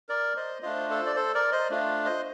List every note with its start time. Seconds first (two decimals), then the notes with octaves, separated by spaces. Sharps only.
0.09 A#4 D5
0.36 C5 D#5
0.62 A3 D4 F4 C5 D#5
0.90 A4 C5
1.06 D5
1.16 A4 C5
1.34 A#4 D5
1.52 C5 D#5
1.70 A3 D4 F4
2.05 C5 D#5